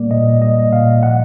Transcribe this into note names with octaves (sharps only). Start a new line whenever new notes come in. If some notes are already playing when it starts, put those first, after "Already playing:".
Already playing: A#2 G3 A#3 D5
A#2 D#5
G3 D#5
A#2 F5
F3 F#5